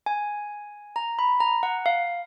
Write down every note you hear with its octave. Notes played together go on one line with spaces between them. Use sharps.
G#5
A#5
B5
A#5
F#5
F5